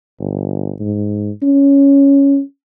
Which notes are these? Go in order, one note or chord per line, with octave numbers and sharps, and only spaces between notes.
G1
G#2
C#4